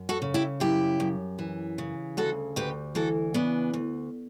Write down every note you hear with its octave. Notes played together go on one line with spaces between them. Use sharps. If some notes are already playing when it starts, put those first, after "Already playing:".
Already playing: F#2
F#4 A4
C#3
E4 G4
F#2 E4 G4
F#2
E3
C#3
D2 F#4 A4
D2 G4 B4
E3 F#4 A4
C#3 B3 D4
D2